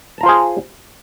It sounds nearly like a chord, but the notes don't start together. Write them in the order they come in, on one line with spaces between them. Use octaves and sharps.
A5 A#5 F4 C5 G#4